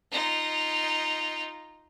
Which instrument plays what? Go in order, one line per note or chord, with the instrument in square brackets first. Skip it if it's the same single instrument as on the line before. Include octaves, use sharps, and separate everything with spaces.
[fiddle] D#4 F4